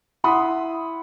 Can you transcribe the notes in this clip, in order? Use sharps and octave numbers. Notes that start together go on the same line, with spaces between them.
E4 F#5 B5 C6 D#6